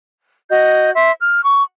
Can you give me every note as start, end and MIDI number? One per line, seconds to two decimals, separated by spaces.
0.50 0.91 66
0.50 0.91 75
0.50 0.91 91
0.95 1.11 76
0.95 1.11 84
1.21 1.42 89
1.42 1.62 85